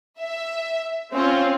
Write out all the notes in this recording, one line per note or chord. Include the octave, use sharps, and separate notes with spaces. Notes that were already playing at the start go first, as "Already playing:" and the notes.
E5
C4 C#4 F4